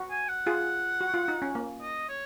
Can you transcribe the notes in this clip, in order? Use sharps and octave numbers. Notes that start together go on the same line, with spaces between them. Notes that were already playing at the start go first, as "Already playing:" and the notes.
Already playing: F#4
G#5
F#5
F4 G#4
F#4
F4
D#4
C#4
A#3
D#5
C#5